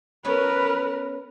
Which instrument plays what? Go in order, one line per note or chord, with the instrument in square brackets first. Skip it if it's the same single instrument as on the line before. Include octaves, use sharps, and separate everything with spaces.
[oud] B3 C#4 C#5 [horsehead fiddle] A#4 B4